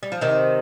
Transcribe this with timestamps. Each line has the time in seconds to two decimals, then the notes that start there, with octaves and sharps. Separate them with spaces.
0.03 G3
0.12 F3
0.21 C3 D#3